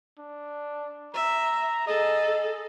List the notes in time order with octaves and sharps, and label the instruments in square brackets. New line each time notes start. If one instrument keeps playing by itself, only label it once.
[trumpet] D4
[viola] E5 [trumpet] A#5
[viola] G#4 A4 [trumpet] D#5